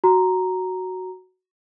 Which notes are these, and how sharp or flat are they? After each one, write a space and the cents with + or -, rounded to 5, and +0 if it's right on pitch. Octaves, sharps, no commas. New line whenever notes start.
F#4 +5 A#5 +0